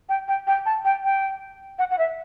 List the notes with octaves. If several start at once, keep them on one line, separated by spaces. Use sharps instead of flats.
G5
G5
G5
A5
G5
G5
F#5
F#5
E5